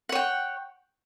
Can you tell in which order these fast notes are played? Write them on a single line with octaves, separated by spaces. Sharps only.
F#5 C#5 G5